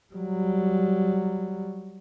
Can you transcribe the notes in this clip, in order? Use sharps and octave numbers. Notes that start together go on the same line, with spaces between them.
F#3 G3